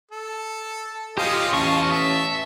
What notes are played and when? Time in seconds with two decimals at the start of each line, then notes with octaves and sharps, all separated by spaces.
0.11 A4
1.18 C#4 F4 G4 C5 D#5 F5 G#5
1.53 A1 E2 C#4 D#5 F5 A5 C#6
1.92 E5 A5